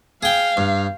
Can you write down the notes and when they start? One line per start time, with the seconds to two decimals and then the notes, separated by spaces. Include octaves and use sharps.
0.23 G#4 F5 G5
0.57 G2